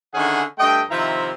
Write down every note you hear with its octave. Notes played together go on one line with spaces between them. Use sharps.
D3 D#3 C#4 E4 G#4 F#5
G2 A3 D#5 G5
C3 D#3 F3 E4 E5 A#5